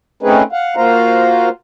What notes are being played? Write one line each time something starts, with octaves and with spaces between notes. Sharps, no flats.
A3 C4 C#4 D#4 G#4 B4
F5 F#5
A#3 F4 F#4 C5 F5 A#5